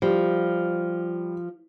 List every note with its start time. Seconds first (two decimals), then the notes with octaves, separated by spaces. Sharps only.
0.02 F3 G3